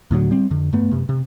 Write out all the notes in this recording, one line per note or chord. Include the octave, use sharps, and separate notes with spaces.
D2 A2 D3 F#3
G3 C4
F2 D3
G2 A3 B3
F#2 C3
C3